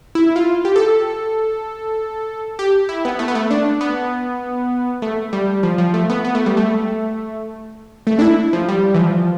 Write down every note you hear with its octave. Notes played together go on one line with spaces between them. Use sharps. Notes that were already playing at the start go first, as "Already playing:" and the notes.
E4
F4
G4
A4
G4
E4
B3
A3
B3
A3
D4
B3
A3
G3
F3
F3
A3
B3
B3
A3
G3
A3
A3
D4
E4
F3
G3
E3
F3